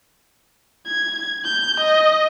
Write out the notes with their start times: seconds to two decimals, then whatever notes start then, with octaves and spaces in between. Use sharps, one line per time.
0.87 G#6
1.45 G6
1.81 D#5